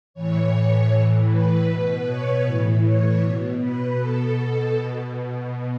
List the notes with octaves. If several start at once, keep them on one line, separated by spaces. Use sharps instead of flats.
A2 E3 C#5
C#5
A2 E3
B4
B2 B4
C#5
A2 E3
C#5
B2
B4
B2 A4
B2